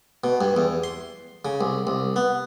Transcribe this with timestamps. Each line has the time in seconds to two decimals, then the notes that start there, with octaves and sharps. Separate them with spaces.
0.24 B2
0.41 G2
0.57 E2
0.84 C6
1.45 C#3
1.61 C2
1.87 C2
2.16 B3